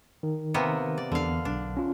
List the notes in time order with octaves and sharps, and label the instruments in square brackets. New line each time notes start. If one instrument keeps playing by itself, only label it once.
[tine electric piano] D#3
[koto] C3 A#3 B3
D5
[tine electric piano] E2 [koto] D3 F5
[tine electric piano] B1 [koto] D4
[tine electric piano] C#4 F4